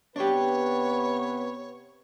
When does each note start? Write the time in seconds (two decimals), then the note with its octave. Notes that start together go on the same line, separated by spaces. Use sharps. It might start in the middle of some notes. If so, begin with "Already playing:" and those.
0.16 C3 B3 D4 G4 B4 C#5